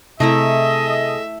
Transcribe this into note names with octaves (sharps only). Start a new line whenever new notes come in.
C3 A3 E4 G#4 A4 D#5 E5 A#5